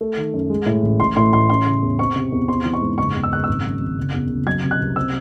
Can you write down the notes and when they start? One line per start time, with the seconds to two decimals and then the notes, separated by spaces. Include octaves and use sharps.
0.01 A3
0.17 D#3
0.34 F#2
0.50 G#3
0.66 A2
0.83 A1
1.00 A1 C6
1.16 A2 C6
1.33 A1 C6
1.49 C#4 C6
1.66 C#3
1.83 E2
1.99 C4 C#6
2.16 C3
2.32 E2
2.48 C4 C6
2.65 E3
2.74 C#6
2.82 G#2
2.98 F#1 C#6
3.15 E2
3.24 E6
3.31 F#1 F#6
3.44 G#1 E6
3.64 F#2
3.80 G#1
3.98 F#1
4.14 E2
4.30 F#1
4.46 F#3 G#6
4.64 C3
4.71 F#6
4.80 C2
4.96 C4 E6